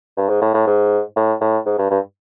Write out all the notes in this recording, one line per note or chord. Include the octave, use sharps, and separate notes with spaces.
G2
G#2
A2
A2
G#2
A2
A2
G#2
G2
G2